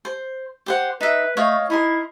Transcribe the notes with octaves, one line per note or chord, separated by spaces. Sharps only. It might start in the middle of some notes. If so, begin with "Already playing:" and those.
C5
G4 C5 F#5
D#4 B4 E5
A3 C#5 D#5 F5
D#4 E4 A#4 C6